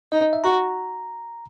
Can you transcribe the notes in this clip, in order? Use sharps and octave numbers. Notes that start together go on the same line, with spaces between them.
D#4 D#5
D#5
E5
F#4 A#5